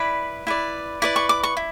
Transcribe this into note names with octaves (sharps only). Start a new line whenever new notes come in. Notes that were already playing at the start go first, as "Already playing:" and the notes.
Already playing: E4 B4 D5 B5
E4 B4 D5
E4 B4 D5 D6
C#6
D6
C#6
E4